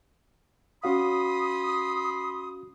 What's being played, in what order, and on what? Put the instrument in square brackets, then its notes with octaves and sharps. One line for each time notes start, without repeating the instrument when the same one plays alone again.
[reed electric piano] C#4 F#4 F5 [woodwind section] B5 C6 D#6